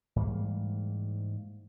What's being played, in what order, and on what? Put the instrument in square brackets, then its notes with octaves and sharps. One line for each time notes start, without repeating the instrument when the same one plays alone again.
[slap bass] G#2 E3 G3 A#3